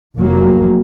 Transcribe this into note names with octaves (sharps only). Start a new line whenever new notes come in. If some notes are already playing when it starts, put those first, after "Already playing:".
F1 F#3 A#3